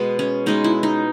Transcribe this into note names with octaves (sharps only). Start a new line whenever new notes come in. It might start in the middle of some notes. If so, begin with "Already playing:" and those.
Already playing: B2 G#3 B3
C#4
B2 G#3 B3 D#4
E4
D#4